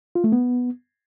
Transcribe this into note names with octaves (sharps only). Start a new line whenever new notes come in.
F4
A3
B3